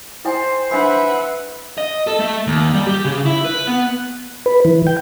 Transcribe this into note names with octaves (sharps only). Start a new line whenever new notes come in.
E4 C5 G5 G#5
D4 B4 E5 F#5 G#5 B5
D#5
A4
A3
D#2
G3
G4
C#3
E4
B4
B3
B4
E3
G5